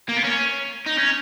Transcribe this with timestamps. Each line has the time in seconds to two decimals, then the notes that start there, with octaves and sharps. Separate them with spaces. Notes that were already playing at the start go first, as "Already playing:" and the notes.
0.09 A#3
0.17 B3
0.24 C#4
0.87 D#4
0.98 C#4